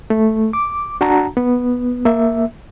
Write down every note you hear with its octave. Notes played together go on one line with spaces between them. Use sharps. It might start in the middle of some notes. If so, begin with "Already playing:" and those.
A3
D6
D4 F#4 F#5 A5 A#5
B3
A#3 E5